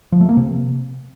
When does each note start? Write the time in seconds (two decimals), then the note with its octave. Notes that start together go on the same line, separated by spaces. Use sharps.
0.12 F3
0.21 A3
0.29 A#3
0.37 C3